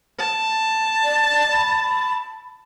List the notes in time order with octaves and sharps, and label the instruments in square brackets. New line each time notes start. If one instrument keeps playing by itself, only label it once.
[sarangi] A5
[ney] D5
B5